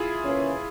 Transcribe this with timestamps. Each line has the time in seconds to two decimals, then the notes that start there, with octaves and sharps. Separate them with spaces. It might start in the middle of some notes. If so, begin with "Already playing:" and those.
Already playing: E4 F4 G#4
0.24 C#3 E3 A#3 C#4